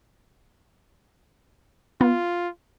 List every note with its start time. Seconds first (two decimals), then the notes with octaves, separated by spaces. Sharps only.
2.01 B3 F4